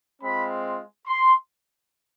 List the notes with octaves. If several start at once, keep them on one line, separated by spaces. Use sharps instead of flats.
G#3 C4 F4 B5
C6